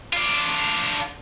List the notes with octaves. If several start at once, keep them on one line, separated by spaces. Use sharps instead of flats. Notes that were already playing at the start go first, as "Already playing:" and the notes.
D4 F4